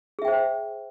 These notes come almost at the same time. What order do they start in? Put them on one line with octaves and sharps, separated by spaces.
G#4 E5 G5 C5